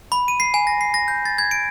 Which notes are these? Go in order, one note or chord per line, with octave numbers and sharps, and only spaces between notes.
B5
D#7
C7
G#5
A#6
C7
A#6
G6
A6
G#6
D7